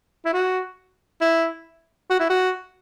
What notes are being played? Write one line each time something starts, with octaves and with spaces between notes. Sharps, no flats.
E4
F#4
E4
F#4
E4
F#4